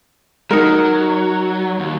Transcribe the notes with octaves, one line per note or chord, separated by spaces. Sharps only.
F#3 D#4 A#4
D#2